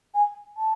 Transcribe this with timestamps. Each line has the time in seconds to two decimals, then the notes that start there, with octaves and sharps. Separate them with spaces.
0.14 G#5
0.57 A5